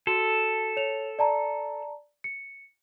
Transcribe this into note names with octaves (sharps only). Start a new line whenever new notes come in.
F#4 A4
C#5 F7
D5 A5 A#5
C#7